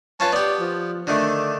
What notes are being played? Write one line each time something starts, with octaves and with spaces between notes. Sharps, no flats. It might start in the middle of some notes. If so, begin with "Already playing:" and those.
C#4 F4 B4 A5
B3 G4 D5
F3
D3 D#3 A3 D4